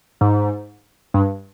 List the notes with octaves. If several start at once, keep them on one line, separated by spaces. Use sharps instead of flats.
G#2
G2